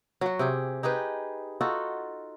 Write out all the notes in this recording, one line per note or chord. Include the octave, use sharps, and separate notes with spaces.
F#3 F#4
C3 G4 G#4
D#4 G4 G#4 B4
D#4 F4 F#4 A4